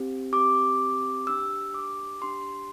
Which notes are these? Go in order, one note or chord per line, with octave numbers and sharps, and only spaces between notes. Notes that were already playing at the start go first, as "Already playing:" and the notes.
Already playing: C4 G4
C4 G4 D6
D4 G4 E6
D6
D4 G4 C6